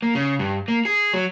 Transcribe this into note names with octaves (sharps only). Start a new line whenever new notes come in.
A#3
C#3
G2
A#3
G#4
F#3